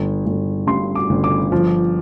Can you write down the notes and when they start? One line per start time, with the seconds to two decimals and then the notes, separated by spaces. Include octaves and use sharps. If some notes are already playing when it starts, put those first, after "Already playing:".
Already playing: G1
0.26 G1
0.67 G2 C6
0.95 D6
1.10 G1
1.24 D6
1.52 F3